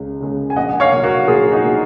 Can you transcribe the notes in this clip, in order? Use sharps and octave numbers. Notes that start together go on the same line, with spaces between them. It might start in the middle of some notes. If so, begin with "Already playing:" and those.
Already playing: C#2 C#3 G#3
C#3 G#3
G#5
A#1 D#5 F#5
C#5 F5
A#2 F#3
F#4 A#4
A#1 F4 G#4
D#4 F#4
A#2 F#3